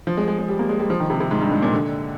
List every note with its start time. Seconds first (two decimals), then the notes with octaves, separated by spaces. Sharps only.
0.07 F3
0.17 G#3
0.28 G#3
0.38 G#3
0.48 G3
0.59 A#3
0.69 G#3
0.79 G3
0.90 F3
1.00 D#3
1.10 C3
1.20 C3
1.31 G#2
1.41 G2
1.52 G#2
1.62 A#2
1.73 D3